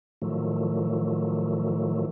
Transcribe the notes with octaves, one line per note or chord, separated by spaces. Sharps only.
A2 D#3 F3 F#3 A3